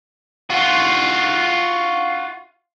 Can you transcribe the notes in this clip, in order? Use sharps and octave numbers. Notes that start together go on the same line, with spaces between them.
F4 F#4